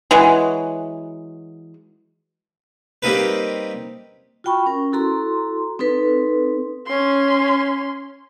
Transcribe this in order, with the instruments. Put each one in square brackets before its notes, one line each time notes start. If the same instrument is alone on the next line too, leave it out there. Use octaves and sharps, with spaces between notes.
[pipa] E3 F#3 G#3
[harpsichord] G3 A#3 C4 D#4 A#4 B4
[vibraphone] F4 F#4 G5 B5 C#6
C#4 A#4
E4 F#4 A4 A#5 C6
C4 D#4 A4 B4
[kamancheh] C#4 C6